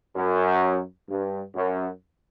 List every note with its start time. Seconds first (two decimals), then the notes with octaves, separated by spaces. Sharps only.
0.16 F#2
1.09 G2
1.55 F#2